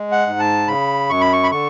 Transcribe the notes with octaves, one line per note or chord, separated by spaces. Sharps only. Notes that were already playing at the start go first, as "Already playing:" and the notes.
Already playing: G#3
F#5
G#2
A5
C#3 B5
F#2 C#6
B5
C#6
B5
D3 C#6